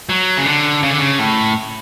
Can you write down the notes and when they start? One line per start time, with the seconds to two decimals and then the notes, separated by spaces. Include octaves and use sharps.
0.09 F#3
0.38 C#3
0.46 D3
0.83 C#3
0.90 D3
0.98 C#3
1.19 A2